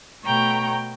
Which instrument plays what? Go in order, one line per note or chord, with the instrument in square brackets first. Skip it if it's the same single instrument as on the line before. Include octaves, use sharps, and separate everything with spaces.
[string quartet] B2 A3 C#5 G5 A#5